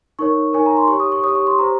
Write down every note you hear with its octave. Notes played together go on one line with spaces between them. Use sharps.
D#4 A#4 C#5 C#6
D#4 A#4 C#5 G#5
A#5
C6
G4 C#5 C#6
D#6
C#6
G4 C#5 D#6
C#6
C6
G4 C5 A#5